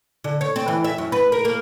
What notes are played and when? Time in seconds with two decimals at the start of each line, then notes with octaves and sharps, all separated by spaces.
0.24 D3
0.41 C#5
0.56 C4
0.68 E3
0.84 E5
0.98 F#2
1.12 B4
1.32 A#4
1.45 A#3